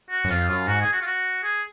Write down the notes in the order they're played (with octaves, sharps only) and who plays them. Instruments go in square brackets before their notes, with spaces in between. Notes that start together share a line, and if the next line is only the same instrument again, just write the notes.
[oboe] F#4
[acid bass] F#2
[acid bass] F2 [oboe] F4
[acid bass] F#2 [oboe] F4
[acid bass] G#2 [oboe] F#4
[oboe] G#4
F#4
F4
F#4
G#4